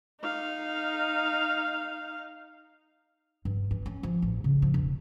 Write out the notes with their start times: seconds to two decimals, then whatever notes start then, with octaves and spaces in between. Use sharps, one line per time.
0.21 D#4 F5
3.45 G2
3.71 E3
3.86 C#4
4.03 F3
4.22 A1
4.44 C#3
4.62 F3
4.74 E1